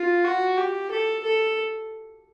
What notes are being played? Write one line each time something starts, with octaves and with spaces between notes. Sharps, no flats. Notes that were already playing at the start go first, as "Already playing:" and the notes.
Already playing: F4
F#4
G4
A4
A4